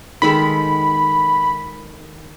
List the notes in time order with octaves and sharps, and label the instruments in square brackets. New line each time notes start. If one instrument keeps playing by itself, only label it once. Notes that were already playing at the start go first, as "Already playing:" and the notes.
[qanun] D#3 G#3 A4 [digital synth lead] B5